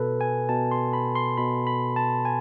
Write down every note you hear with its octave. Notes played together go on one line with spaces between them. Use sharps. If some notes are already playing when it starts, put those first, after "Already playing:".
Already playing: B2 A4 B4
G#5
B2 A5
C6
B5
C6
B2 B5
B5
A5
G#5